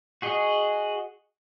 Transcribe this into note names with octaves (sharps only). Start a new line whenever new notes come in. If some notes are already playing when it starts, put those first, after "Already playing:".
F#4 G#4 D#5